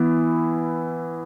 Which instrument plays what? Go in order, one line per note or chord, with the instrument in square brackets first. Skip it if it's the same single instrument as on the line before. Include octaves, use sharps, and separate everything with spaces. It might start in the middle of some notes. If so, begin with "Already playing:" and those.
Already playing: [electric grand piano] E3 B3 E4